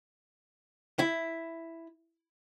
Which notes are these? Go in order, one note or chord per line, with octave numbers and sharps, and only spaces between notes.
E4